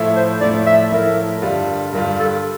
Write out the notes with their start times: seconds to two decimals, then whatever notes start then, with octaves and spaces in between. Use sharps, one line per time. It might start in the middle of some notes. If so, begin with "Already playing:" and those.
Already playing: A2 F3 A3 E4
0.16 C5
0.40 A2 F3 A3 E4 D5
0.66 E5
0.91 A2 F3 A3 E4 A#4
1.42 G2 D3 G3 D4 F4
1.93 G2 D3 G3 D4 F4 A#4
2.19 A4